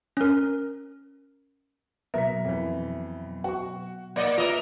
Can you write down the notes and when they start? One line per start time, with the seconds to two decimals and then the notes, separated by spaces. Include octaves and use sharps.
0.17 C#4 A#4
2.14 B2 F#3 B3 A#4 E5 B6
2.44 F2 E3
3.44 F#4 C#6
4.16 A#3 D5 D#5
4.38 F4 A#4 B4 D#5 E5